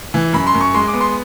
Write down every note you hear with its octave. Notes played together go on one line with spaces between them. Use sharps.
E3
F#2 B5
C6
F#2
C#6
G#3 C6
D6
B3
C6